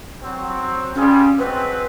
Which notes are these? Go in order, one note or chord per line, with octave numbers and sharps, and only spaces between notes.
F#3 C4
G3 C#4 F4 G#4
F#3 G#3 C4 B4